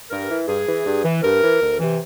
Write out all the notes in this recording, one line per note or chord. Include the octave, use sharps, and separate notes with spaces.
G2 A#4
E3
G2 G#4
E3
G2
E3
G2 A#4
E3
D2
C3 E3